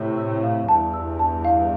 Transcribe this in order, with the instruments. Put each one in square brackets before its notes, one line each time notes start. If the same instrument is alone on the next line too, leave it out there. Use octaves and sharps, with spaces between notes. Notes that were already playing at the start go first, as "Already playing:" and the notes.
Already playing: [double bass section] A2 C3
[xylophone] E6
F5
[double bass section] E2 G2 [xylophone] A5
[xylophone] E6
A5
F5